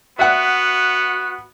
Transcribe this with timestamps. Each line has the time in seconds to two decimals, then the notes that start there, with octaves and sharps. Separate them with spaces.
0.19 B3 F#4 E5 F#5